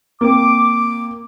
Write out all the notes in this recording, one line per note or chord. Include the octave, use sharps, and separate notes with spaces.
A#3 C4 D6